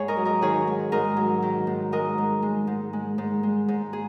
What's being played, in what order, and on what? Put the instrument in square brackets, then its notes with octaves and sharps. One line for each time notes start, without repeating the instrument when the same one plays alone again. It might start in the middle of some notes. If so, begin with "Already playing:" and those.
Already playing: [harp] G#2 G#4 C#5
A#4 D#5
F#3
A#4 D#5
D#3 G#4 C#5
G#2
G#2 A#4 D#5
F#3
D#3
G#2
G#3 A#4 D#5
G#2
G#3
G#2
G#3
G#2
G#3
G#2
G#4